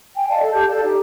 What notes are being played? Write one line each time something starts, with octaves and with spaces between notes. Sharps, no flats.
G5 G#5
D5 D#5 F5 A5
A4
G4 A5 G6
A4 D5 F5 A5
D#4 G4